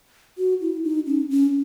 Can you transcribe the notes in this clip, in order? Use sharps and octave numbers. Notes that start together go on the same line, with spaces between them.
F#4
E4
D#4
C#4
C#4